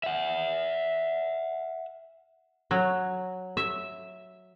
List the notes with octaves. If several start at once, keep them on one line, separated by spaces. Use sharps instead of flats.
E5 F#5
F#3
E5